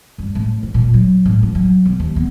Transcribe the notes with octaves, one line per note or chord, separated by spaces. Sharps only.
G2
A2
C#4
A#2
F#3
A2
F3
F#3
B1
D#2
B3